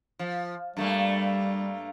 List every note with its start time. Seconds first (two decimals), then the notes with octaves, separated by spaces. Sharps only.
0.19 F3
0.77 G2 G3 A3 A#3